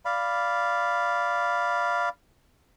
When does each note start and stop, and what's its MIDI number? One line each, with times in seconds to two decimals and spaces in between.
0.05 2.09 74
0.05 2.09 77
0.05 2.09 83